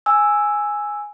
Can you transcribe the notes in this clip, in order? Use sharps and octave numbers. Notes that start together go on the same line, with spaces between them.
G#5 E6